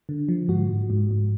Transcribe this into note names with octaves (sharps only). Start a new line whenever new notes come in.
D3
F3
G#2 F#4
G#2
G#2
G#2